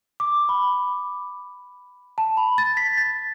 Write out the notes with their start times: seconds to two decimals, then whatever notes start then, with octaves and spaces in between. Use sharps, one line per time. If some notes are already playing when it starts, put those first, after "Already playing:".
0.20 D6
0.49 B5
2.18 A5
2.37 B5
2.58 A6
2.77 B6
2.98 A6